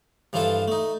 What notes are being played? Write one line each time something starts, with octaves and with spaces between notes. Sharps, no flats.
G2 E3 F3 F4 A4 A5
A3 D#4